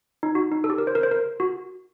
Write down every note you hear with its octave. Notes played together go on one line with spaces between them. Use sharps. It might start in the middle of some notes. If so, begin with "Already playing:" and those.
D#4
F#4
D#4
A4
G4
A#4
C5
A#4
C5
A#4
F#4